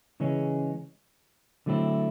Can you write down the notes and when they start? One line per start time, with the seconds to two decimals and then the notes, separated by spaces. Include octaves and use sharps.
0.20 C#3 E3 G#3 C#4
1.66 D3 F#3 A3 C4 E4